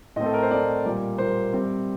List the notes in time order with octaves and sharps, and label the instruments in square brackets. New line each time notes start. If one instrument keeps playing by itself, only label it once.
[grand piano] A2 A3 C4 D#5
A4
A#4
C5
A2 A3 C4 D5
A#2 G3 A#3
A#2 G3 A#3 C5
C3 G3 C4